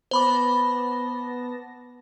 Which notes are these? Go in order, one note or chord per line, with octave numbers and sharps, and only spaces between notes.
B3 C5 A5 B5 D6 A#6